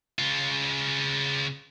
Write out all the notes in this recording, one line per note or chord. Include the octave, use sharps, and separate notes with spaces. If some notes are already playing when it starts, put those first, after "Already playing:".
C#3 F4